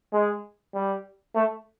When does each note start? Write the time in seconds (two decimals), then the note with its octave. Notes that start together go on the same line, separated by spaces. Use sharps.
0.13 G#3
0.74 G3
1.35 A3